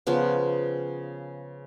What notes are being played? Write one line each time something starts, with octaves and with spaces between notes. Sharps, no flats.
C#3 F3 B3